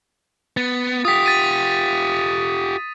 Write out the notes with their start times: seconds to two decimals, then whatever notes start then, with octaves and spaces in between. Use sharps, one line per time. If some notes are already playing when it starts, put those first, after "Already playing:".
0.57 B3 A6
1.05 F4 G4 D#6 B6
1.26 A6 B6 D#7